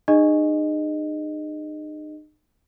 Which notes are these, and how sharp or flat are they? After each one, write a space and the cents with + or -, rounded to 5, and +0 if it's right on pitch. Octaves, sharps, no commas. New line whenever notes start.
D#4 -40 G#4 -20 D#5 -10